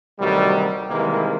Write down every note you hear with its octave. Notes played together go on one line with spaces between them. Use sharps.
D2 C3 D#3 F#3 G3
C3 D#3 E3 G3 G#3 A#3